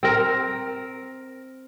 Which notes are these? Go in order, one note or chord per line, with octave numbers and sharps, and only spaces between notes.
C4 A#4